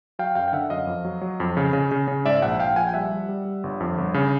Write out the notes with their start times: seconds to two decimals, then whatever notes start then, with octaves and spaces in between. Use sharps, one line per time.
0.19 F#3 F5 G5
0.35 F#2 F5 G5
0.48 G5
0.53 D3 E5 F#5
0.70 F#2 D#5 F5
0.87 F2
1.05 F#3
1.21 F#3
1.40 F2
1.57 C#3
1.73 C#3
1.91 C#3
2.08 C#3
2.25 G#2 D5 E5
2.42 A#1 E5 F#5
2.60 A#1 F5 G5
2.76 F3 F#5 G#5
2.87 G5
2.94 G3 E5 F#5
3.12 G3
3.29 G3
3.45 G3
3.64 G1
3.80 F2
3.98 G1
4.14 C#3